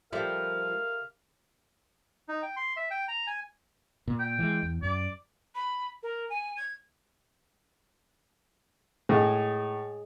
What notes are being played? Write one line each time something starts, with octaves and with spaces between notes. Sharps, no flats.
F3 G3 G4 A4 A#4 E5 F5
D#4
G5
C6
E5
G5
A#5
G#5
A#2
G5
E3 F#3 G#3
E2
F#2 D5
B5
A#4
G#5
G#6
A2 G#4 D#5